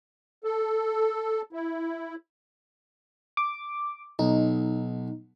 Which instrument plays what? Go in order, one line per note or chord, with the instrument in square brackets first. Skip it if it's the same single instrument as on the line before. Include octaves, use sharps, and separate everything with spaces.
[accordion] A4
E4
[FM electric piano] D6
[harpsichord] B1 [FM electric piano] D#4